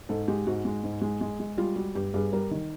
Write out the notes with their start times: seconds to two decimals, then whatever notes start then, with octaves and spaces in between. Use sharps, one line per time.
0.09 G#2 A4
0.28 G#3 G4
0.47 G#2 F#4
0.65 G#3
0.84 G#2
1.01 G#3
1.21 G#3
1.40 G#3
1.57 G3 F4
1.76 G3 F#4
1.95 G2 G4
2.14 G2 G#4
2.32 G3 A#4
2.51 D#3